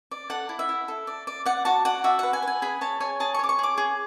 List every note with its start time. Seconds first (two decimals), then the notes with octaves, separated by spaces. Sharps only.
0.11 D5
0.30 A4 F#5
0.49 E4
0.59 E5
0.69 E4
0.88 A4
1.07 D5
1.27 D5
1.45 D5 F#5
1.65 F#4 A5
1.85 D5 F#5
2.04 F#4 E5
2.19 B4 F#5
2.33 G#5
2.42 B4
2.48 G#5
2.62 G#4 B5
2.81 C#5 A5
3.00 C#5 G#5
3.20 G#4 A5
3.34 C#6
3.39 C#5 D6
3.49 C#6
3.59 G#4 D6
3.78 G#4